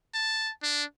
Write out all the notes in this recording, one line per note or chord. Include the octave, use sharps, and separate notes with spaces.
A5
D4